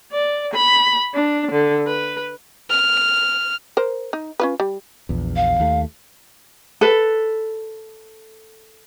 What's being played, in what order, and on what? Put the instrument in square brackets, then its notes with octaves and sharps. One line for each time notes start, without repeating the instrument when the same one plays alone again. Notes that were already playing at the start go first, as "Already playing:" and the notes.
[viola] D5
B5
D4
D3
B4
[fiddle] F6
[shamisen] A#4 C5
D#4
C#4 F4 B4
G3
[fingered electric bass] A#1 E2
[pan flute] F5
[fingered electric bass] D#2 A3
[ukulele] A4 B4